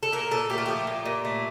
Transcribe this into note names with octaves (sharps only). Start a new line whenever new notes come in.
A4
A#2 A#4
A#2 A4
A3 G4
F4
F3 G4
A#2
A#2
A3